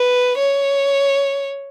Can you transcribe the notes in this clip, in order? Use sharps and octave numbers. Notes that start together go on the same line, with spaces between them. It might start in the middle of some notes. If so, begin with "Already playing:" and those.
Already playing: B4
C#5